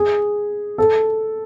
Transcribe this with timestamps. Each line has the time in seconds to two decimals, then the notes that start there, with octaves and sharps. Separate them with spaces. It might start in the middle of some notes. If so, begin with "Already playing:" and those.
Already playing: G#4
0.78 A4